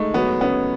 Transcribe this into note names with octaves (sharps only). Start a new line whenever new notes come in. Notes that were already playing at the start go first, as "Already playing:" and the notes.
Already playing: G#3 A3 D#4
F#3 B3
B3 C#4